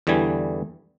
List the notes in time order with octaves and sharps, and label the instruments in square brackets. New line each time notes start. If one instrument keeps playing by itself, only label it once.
[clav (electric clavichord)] E2 D3 E3 G3 G#5